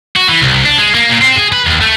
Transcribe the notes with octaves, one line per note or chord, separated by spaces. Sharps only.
F#4
E3
C2
D4
G#3
A#3
A#2
C4
G#4
B4
D#2
A3